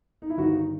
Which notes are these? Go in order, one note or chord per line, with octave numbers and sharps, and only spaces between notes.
D#4
E4
G1 G2 D#3 G3 D#4 F#4
D#4